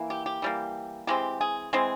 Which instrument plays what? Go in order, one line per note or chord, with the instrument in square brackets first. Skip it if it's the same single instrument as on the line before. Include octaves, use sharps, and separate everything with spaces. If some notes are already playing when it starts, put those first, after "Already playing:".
Already playing: [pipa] E3 A#3
G4
G4
E3 G3 A#3
E3 G#3 C4 G4
G#4
E3 G#3 C4 G#4